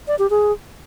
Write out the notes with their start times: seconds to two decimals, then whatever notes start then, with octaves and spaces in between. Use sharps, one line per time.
0.08 D5
0.19 G4
0.30 G#4